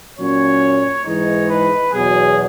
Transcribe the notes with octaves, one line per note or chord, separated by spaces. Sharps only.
A#2 F#3 C#4 C#5
G#2 E3 G#3 D#4 C#5
B4
E2 B2 F#3 G#4